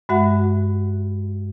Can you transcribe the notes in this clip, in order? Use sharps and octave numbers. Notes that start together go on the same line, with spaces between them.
G2 G#3 F#4 E5 F#5